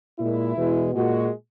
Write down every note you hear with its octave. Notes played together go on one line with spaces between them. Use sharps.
A#2 G#3 E4
E2 B2 G#3
A#2 G#3 F#4